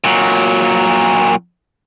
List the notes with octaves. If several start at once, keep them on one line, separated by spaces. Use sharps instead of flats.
A#2 F#3